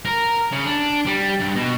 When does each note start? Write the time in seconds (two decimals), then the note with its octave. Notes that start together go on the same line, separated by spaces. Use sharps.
0.05 A#4
0.52 C#3
0.66 D4
1.06 G3
1.40 G2
1.55 B2